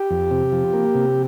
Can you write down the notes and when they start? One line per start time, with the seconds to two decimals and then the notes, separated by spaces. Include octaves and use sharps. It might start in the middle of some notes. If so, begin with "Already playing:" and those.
Already playing: G4
0.11 F2
0.31 C3
0.52 F3
0.73 A#3
0.95 C3